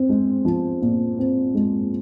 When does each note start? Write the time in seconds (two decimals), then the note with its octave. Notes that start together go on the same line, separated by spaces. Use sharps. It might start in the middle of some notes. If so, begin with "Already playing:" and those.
Already playing: C4
0.09 G#3
0.45 F3
0.82 A#2
1.19 C4
1.55 G#3